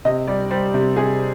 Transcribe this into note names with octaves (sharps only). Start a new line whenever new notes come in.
C3 D#5
G3 D5
G3 C5
C3
C3 G#4